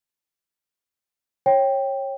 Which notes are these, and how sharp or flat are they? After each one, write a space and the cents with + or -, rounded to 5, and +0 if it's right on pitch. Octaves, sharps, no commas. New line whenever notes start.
C#5 -20 G5 +0